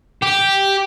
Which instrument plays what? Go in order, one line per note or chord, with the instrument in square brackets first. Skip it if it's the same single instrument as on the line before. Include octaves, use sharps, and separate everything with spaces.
[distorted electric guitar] G4